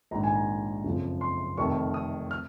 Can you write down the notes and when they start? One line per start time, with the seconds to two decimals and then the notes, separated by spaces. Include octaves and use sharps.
0.11 A#1 G#2 D#3 A#5
0.24 G#5
0.35 A#5
0.84 F#1 F2 C#3 F3
1.21 C6
1.57 F1 F2 C3 D#3 C#6
1.94 D#6
2.31 F6